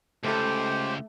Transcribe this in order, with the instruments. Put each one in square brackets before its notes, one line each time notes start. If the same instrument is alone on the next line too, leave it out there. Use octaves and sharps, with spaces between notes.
[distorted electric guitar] C#2 [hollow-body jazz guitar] A3 A4 [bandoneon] G4 C5